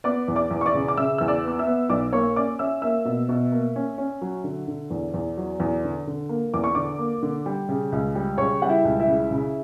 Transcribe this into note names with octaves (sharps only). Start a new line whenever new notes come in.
B3 D5 D6
E2
D5 D6
E2
C#6
D5 D6
C#3
D6
C#3 E5 E6
E2 E6
D5 D6
B3 D6
E5 E6
B3
B1 D5 D6
A#3 C#5 C#6
C#4 D5 D6
C#4 E5 E6
A#3 E5 E6
B2
B2
A#3
C#4
C#4
F#3
D3
D3
E2
E2
F#3
E2
D3
D3
A#3
E2 D6
C#6
D3 D5 D6
A#3
D3
G3
C#3
C#2
G3
C#3 C#5 C#6
G3 F#5
E4 E5
C#2
E4 E5
C#3
C#3